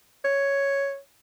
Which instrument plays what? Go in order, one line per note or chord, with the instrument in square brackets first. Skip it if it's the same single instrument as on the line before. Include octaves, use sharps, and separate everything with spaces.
[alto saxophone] C#5